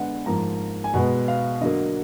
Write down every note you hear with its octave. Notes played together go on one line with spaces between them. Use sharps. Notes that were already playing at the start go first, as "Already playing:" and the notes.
Already playing: D3 G#3 B3 F#5
G#2 F3 A#3 A#5
G#5
B2 G#3 B3 F#5
F5
D3 F#3 A#3 D#5